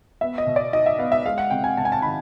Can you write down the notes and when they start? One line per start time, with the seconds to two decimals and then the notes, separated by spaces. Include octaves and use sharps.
0.21 B3 E5
0.38 D#5
0.47 B2
0.56 D5
0.73 D#4 D#5
0.86 E5
0.98 B3 F5
1.12 E5
1.26 G#3 F5
1.38 F#5
1.50 C3 G5
1.64 G#5
1.77 C3 A5
1.85 G#5
1.92 A5
2.02 D#3 B5